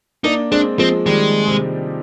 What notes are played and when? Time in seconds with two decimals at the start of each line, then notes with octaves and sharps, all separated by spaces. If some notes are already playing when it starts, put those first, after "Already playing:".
0.24 A#3 D4 D#4
0.52 G#3 C4 D4
0.79 F3 G#3 C4
1.06 D#3 G3 G#3
1.48 C3